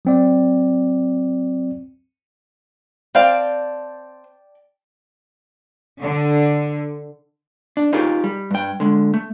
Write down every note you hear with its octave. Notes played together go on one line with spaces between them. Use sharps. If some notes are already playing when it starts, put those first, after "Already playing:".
F#3 C4 D5
C4 D5 F5 G5 A5
D3
D4
D#4 F4 G4 G#4 A#4
G3
G2 G5
D3 G#3
A3